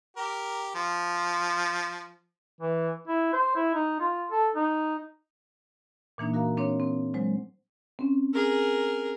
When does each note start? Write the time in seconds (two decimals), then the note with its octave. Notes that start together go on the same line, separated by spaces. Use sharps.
0.17 G4 A#4
0.75 F3
2.61 E3
3.08 E4
3.33 C5
3.56 E4
3.74 D#4
4.00 F4
4.31 A4
4.55 D#4
6.18 A#2 E3 A#3 D4 D#4
6.34 F#4 A#4 F5 A#5
6.57 C4 D4 C#5
6.80 C4
7.14 F#3 G#3 C5
7.99 C4 C#4
8.33 G#4 A#4